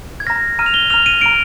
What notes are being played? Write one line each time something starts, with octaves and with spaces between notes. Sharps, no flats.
G#6
A#5 F6 A#6
A#5 F6 D#7
F7
G7
A#5 F6 F7
D#7
A#5 F6 D7